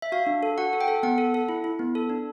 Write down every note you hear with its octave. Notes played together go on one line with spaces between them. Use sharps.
E5
F#4 F5
D4
A4
F#4 F#5
A4
G5
A4
B3 F#5
A4
A4
E4
E4
B3
A4
D4